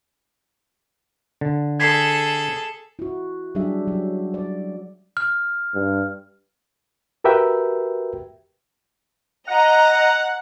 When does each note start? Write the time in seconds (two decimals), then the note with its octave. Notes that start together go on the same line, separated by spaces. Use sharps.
1.41 D3
1.80 G#4 A4 G#6 B6 C7
2.99 E4 F#4
3.55 F#3 G3 D4 G4 G#4 E5
3.88 F#3
4.34 D5
5.17 F6
5.74 G2
7.24 F#4 G4 A#4 B4 E5 G5
9.48 D#5 F#5 A#5